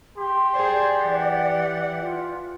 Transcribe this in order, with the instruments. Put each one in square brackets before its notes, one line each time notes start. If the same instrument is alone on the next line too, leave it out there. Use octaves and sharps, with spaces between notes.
[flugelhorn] G4 [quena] C6
[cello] G#4 C5 [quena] D5
[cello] E3 F#5
[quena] F4